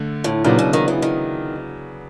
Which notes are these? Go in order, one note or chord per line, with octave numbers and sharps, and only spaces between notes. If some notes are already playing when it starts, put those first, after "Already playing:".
Already playing: D3 A3
A2
A#2 C#3 F#3 B3 D4
B2
D#3
E3
D#3